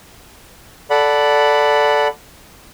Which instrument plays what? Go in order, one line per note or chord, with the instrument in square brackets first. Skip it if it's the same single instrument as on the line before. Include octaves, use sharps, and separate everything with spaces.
[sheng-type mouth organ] A4 D5 F#5 B5